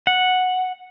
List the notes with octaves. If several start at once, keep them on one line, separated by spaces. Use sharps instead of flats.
F#5